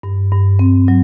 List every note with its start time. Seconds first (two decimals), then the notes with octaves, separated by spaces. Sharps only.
0.03 G2
0.32 G2
0.59 C4
0.88 F#3